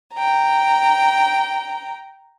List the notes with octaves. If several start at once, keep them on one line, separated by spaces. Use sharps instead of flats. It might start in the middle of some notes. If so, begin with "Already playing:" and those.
G5 A#5